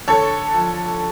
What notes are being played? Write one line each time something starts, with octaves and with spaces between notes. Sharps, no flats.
D3 A4 C#5
F3